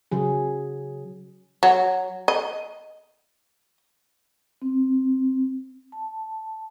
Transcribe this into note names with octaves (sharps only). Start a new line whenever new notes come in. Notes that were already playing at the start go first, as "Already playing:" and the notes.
C#3 F#3 G#4
F#3
D#5
C4
A5